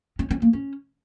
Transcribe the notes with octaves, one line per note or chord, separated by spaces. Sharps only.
C#4
C#4
A#3
C#4